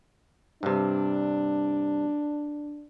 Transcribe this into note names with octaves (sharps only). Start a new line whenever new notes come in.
G2 C3 D4